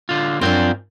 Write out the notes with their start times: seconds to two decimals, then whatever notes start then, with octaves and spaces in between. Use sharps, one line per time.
0.09 D3 F4
0.41 F#2 C4 D4 F4 G5